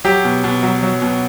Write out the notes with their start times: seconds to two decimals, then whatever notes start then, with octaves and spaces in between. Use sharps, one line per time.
0.04 F#3 G4
0.24 B2
0.44 B2
0.63 F#3
0.83 F#3
1.02 B2